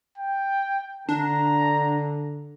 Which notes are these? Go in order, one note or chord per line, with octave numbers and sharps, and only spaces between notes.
G5
D3 D4 A#5